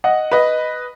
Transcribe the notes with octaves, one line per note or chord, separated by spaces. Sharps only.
D#5 F#5
B4 D#5